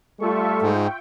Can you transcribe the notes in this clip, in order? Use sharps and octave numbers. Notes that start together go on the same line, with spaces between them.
G3 A3 F4 A4 E5 C#6
G#2 G5